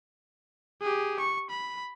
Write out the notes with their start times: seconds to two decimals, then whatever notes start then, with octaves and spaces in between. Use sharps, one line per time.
0.82 G4 G#4
1.20 C#6
1.50 B5